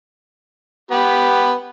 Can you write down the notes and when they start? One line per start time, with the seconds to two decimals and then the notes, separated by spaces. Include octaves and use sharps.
0.91 B3 G4 B5